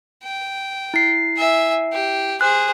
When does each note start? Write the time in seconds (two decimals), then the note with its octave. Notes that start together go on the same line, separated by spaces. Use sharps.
0.23 G5
0.94 E4 C7
1.37 E5 G#5
1.93 G4
2.41 G#4 C5 F#6